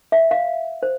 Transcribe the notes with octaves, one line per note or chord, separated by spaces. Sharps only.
E5
F5
C5